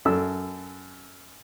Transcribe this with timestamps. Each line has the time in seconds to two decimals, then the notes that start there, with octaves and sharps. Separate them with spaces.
0.05 F#2 A4 E6